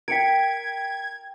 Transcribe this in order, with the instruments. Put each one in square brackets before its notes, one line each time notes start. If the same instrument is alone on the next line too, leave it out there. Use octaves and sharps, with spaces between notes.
[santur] A#4 G5 [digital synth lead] G#6 [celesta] B6 C#7 D7